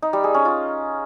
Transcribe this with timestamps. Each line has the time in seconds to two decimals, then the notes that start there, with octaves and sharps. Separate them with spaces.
0.02 D#4
0.13 G3
0.24 G#4
0.34 C#4
0.45 F4